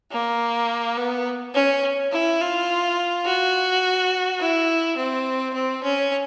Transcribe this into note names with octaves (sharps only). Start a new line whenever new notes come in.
A#3
B3
C#4
E4
F4
F#4
E4
C4
C4
C#4